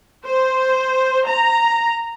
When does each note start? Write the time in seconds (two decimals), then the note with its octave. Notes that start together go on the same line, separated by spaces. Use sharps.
0.25 C5
1.26 A#5